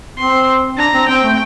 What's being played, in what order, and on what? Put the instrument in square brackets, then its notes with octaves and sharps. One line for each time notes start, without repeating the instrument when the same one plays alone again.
[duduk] C4 [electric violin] C6
[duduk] D4 [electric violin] A#5
[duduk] C4
[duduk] C4 [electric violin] G5
[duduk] A3